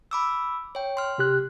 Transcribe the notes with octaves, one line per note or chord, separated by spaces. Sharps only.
B5 D6 E6
C#5 G5
C6 F6
C3 G4 F#6